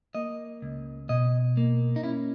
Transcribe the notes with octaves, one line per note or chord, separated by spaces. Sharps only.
A#3 D#5
C#2
B2 D#5
A#3
D#4
C#4 E4